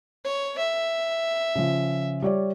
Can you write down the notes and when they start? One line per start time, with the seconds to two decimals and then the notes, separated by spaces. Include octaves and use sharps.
0.25 C#5
0.58 E5
1.55 C#3 F3
2.22 G3 C#5 D5